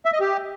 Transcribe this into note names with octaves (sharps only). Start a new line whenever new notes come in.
E5
D#5
G4